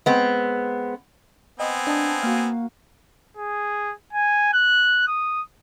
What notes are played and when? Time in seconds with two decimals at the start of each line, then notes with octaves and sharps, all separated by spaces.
0.06 G#3 B3 C4
1.60 B3 C4 D#5 G#5
1.87 D4 D#5 A5
2.23 A#3 F#4 F5
3.37 G#4
4.13 G#5
4.53 F#6
5.07 D#6